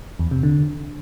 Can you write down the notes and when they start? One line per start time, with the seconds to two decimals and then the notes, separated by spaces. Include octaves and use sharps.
0.19 E2
0.31 C3
0.43 D3